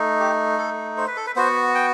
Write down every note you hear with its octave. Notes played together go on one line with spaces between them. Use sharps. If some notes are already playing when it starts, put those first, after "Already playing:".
Already playing: A3 D#4
G4
A4
C5
B4
A4
B4
B3 F#4 C5
G5